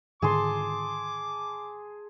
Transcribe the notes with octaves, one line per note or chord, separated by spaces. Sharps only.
G#2 D3 D#3 G#4 A5 C6 D6